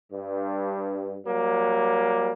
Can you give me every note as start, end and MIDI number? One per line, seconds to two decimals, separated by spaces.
0.13 1.17 43
1.27 2.33 54
1.27 2.33 55
1.27 2.33 58